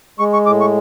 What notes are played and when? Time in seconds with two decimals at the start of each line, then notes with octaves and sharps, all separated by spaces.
0.19 G#3 C#6
0.33 C#6
0.46 A2 D6
0.61 C#6